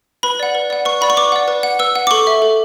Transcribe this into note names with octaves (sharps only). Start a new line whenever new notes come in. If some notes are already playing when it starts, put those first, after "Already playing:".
B4 B5
D5 F#5
B4
D5 F#5
B4 C#6
D5 F#5 B5
C#6
B4 D6
D5 F#5
B4
F#5
B4 E6
F#5
D6
A4 C#6
E5
A4